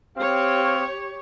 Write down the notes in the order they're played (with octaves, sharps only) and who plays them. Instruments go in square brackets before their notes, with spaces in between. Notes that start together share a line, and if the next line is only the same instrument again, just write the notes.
[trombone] C4 [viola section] G4 C#5 [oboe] F5